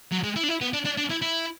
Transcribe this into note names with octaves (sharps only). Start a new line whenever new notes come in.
F#3
G#3
E4
D4
E4
B3
D4
D4
D4
E4
E4